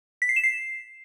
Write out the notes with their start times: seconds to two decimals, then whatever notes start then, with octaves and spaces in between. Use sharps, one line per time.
0.22 B6
0.29 C7
0.36 E7
0.44 C7